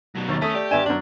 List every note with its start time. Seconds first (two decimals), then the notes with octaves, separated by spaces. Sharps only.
0.15 F#2 B2
0.29 D#2 C#6 A6
0.42 A3 C#4 D#6 B6
0.55 G4 D5
0.71 G2 D4 D5 E5 G#5 E7
0.86 F#2 D4 F#7